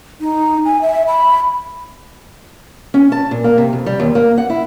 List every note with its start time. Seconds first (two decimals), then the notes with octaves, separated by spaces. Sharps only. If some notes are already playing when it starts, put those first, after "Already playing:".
0.21 D#4
0.65 G#5
0.82 E5
1.08 B5
2.94 C#4
3.12 A5
3.31 A#2
3.44 A#3
3.58 C3
3.73 F2
3.86 G3
4.00 D#2
4.15 A#3
4.38 F#5
4.50 E4